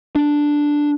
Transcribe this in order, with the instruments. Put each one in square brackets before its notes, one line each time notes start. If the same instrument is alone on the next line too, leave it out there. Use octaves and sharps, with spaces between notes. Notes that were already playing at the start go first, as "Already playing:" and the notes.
[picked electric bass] D4